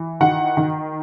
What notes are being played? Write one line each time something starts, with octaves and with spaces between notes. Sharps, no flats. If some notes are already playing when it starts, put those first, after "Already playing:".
Already playing: E3
D#3 F#5
D#3